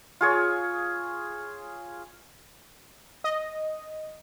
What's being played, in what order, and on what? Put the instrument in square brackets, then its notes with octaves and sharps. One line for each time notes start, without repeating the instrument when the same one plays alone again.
[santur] F4 G#4 C#5
[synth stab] D#5